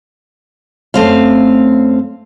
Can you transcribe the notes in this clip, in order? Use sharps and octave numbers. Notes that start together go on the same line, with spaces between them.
F#2 A3 C4 F5